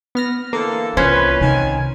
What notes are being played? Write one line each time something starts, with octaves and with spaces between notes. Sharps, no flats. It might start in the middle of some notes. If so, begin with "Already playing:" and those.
B3 F6 A#6
D3 E3 A#3 A4
C2 A#2 E3 B3 C#4 B4 C5
C3 D#3 G#5